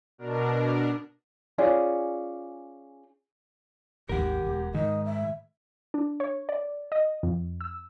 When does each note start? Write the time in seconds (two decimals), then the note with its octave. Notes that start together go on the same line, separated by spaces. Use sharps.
0.18 B2 D4 A#4
1.58 C#4 F4 G#4 D5
4.09 G#1 D#2 G4 A#4 F#5
4.46 E1
4.74 G#2 D#3 D#5
5.05 E5
5.94 D4
6.20 C#5
6.49 D5
6.92 D#5
7.23 F2
7.61 E6